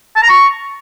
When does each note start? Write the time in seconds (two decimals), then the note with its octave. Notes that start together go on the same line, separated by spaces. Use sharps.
0.16 A5
0.23 A#5
0.29 C#6